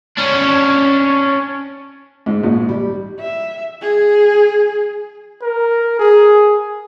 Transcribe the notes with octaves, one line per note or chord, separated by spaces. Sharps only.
C#4 D4
G#2
A#1
G3
E5
G#4
A#4
G#4